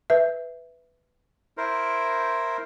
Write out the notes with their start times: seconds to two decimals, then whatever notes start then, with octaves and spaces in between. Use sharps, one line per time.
0.10 B4 E5
1.57 E4 A#4 C5